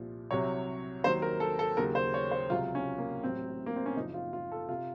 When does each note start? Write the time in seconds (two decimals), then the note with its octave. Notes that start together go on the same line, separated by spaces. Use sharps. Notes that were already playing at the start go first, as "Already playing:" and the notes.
Already playing: C2 A#2 F3
0.31 C2 C3 F#3 C#5
1.04 D#2 D#3 F#3 C5
1.22 A#4
1.40 A4
1.59 A4
1.77 D#2 C#3 F#3 A#4
1.95 C5
2.14 C#5
2.31 C5
2.50 C#2 C3 F#3 F4
2.75 C#4
2.98 A#3
3.24 A1 A2 F#3 C4
3.66 A#3
3.76 C4
3.86 C#4
3.96 F#1 F#2 F3 D#4
4.14 F4
4.33 F4
4.52 A4
4.69 C3 F4